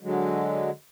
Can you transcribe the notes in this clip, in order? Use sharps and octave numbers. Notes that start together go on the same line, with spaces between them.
D3 F#3 G#3